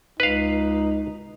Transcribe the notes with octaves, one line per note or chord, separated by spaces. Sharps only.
C#2 D#4 B4 F5